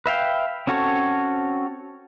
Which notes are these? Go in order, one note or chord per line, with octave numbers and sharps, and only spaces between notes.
B4 E5 F5 G5
C4 C#4 F#4 A4 C#5